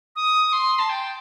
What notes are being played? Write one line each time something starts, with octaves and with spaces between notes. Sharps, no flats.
D#6
C6
A5
G5